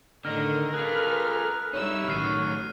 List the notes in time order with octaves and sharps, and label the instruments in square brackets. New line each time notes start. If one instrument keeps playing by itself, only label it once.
[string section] A2 D#3 D#5 [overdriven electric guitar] D3 [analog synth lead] A#4 [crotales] F6
[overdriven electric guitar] F4 G#4 [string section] A4 B4 F6 [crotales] F#6
[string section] G3 E6 [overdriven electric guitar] D#4 E4 [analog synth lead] C#5
[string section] A1 [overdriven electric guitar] D#3 F#3 [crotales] F6 C7 D#7